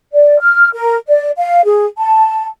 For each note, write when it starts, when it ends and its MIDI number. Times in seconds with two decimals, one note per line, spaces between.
0.14 0.39 74
0.40 0.69 89
0.74 0.96 70
1.08 1.29 74
1.37 1.61 77
1.65 1.85 68
1.98 2.46 81